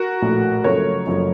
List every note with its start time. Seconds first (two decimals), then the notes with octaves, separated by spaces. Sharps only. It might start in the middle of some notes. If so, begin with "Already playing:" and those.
Already playing: F#4 A#4
0.22 A#1 A2 A3
0.64 F#1 F#2 F3 A3 A#4 C#5
1.06 F#1 F#2 F3 A3